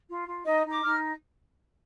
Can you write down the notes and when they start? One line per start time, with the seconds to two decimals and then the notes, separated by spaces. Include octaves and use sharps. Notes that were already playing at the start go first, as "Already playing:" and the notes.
0.08 F4
0.26 F4
0.45 D#4 D#5
0.64 D#4
0.71 D6
0.83 D#4 F6